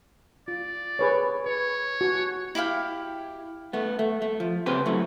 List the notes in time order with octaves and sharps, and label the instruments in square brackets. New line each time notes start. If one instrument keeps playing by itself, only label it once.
[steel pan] F4 [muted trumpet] D5
[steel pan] G#4 B4 C#5
[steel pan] B4 [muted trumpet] C#5
[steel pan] F#4
[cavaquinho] E4 G4 F5 G5
[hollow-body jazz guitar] A3 B3
A3
A3
F3
C#3 C4 C#4 G4 B4 C5
F#3 A3 E4